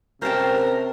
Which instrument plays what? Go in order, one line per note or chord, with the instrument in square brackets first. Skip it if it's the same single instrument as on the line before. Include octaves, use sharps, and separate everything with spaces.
[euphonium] C3 [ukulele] C#4 G4 G5 [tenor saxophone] A#4 [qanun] C5 A5